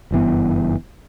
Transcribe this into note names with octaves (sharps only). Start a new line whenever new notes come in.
F#1 G2 E3 B3